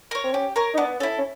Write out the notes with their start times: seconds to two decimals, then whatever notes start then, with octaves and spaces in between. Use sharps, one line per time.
0.11 A#4 C#5
0.24 C4
0.33 C#4 G4
0.56 A#4 C#5
0.74 D#4
0.78 B3 D4
1.00 C#4 E4 A4
1.18 C#4